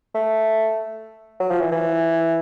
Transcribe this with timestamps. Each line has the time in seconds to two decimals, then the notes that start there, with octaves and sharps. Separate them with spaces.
0.15 A3
1.40 F#3
1.51 F3
1.61 E3
1.72 E3